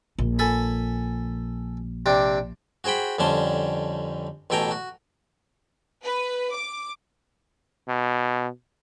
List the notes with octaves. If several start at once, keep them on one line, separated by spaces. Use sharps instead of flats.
A#1
A4 G#5 B5
C3 C4 D4
F#4 G#4 C5 G5 B5
F2 D3 G3 C#4 A5 C6
A1 B2 A4 G5 G#5 A#5
F#4
B4
D6
B2